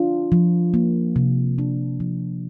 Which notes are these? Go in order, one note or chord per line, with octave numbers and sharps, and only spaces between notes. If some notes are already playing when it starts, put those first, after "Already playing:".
Already playing: D4 F4
F3
A#3
C3
D4
F3